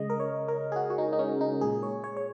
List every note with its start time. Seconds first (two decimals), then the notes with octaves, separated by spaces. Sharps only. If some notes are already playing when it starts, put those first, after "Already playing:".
Already playing: C#3 G#3 D#5
0.10 A#4
0.20 C#5
0.48 A#4
0.72 G#4
0.76 F#4
0.90 F#4
0.98 D#4
1.13 D#4
1.19 C#4
1.41 D#4
1.61 A#2 G#3 G#4
1.83 C#5
2.04 C#5
2.17 C#5